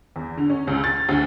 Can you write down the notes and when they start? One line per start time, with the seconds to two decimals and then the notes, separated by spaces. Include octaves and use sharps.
0.16 E2
0.37 D3
0.50 C#4
0.67 C#2
0.84 A6
1.09 D2